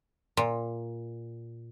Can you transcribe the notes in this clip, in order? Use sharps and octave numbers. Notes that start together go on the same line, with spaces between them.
A#2